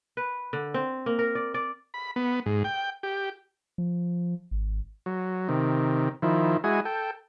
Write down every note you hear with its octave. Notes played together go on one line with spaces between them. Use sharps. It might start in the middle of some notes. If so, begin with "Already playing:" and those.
B4
D3
C4
A#3
A#4
D5
D5
B5
B3
G#2
G5
G4
F3
G#1
F#3
C3 D#3
D#3 F3 E4
G#3 E4 F#4 G#5 D#6
A4 G5